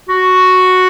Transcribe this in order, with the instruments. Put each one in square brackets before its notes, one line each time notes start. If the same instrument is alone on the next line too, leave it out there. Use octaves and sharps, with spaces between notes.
[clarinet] F#4